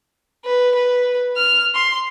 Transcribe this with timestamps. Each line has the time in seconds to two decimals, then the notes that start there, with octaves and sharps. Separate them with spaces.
0.44 B4
0.75 B4
1.36 F6
1.74 C6